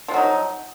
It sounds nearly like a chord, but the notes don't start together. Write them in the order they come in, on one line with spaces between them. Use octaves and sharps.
F3 C3 F#3 D#4